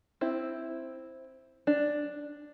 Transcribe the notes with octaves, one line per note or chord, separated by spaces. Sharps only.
C4 E4
D4